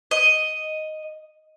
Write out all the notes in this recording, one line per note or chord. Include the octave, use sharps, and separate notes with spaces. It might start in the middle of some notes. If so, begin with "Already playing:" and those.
D#5